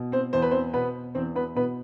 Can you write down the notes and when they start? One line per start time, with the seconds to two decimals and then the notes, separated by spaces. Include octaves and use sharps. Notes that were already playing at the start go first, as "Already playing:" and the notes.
Already playing: B2
0.12 C4 C5
0.33 E2 C5
0.42 B4
0.51 C4 C5
0.74 B2 B3 B4
1.15 E2 C4 C5
1.36 B3 B4
1.55 B2 B3 B4